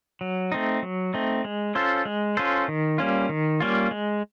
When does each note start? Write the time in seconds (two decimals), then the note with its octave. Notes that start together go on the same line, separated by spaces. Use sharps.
0.21 F#3
0.52 A3 C4 D#4
0.83 F#3
1.14 A3 C4 D#4
1.45 G#3
1.75 C#4 F4 A4 C5
2.05 G#3
2.37 C#4 F4 A4 C5
2.68 D#3
2.98 G3 A#3 C#4 F4
3.29 D#3
3.60 G3 A#3 C#4 F4
3.91 G#3